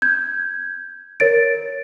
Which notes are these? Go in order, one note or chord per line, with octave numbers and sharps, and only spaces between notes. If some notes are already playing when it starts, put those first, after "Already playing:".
G6 G#6
A#4 C#5 A6 D7